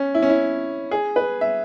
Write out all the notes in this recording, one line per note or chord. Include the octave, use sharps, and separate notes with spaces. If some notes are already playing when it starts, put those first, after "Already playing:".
Already playing: C#4
E4
C#4
E4
G#4
B4
E5